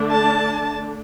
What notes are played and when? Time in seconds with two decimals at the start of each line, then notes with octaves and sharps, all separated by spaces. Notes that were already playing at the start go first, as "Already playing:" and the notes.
Already playing: D3 A3 D4
0.09 A5